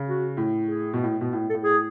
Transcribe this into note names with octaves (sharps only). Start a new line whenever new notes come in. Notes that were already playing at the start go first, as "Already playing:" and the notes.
Already playing: C#3
F#4
A2
G#4
B2
A2
B2
A2
A4
A2
G#4